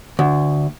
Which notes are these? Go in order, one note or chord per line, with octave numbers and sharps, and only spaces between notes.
D2